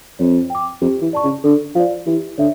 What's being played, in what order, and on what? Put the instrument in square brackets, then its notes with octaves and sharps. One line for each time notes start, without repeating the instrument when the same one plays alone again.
[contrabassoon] F2 [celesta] C#5
[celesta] G5 D6
[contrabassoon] F2 [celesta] G4
[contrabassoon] E3
[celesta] D5 A5 C#6
[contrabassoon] C#3
[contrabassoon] D3 [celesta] A4
[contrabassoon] F3 [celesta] D5 F5
[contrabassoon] E3 [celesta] G4
[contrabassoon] D3 [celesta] C#5 E5